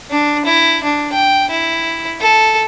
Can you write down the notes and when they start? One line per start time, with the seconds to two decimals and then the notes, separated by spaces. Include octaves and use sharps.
0.10 D4
0.45 E4
0.84 D4
1.13 G5
1.50 E4
2.21 A4